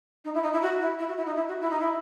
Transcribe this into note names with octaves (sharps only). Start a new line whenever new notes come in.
D#4
E4
D#4
E4
F#4
E4
E4
F#4
E4
D#4
E4
F#4
E4
D#4
E4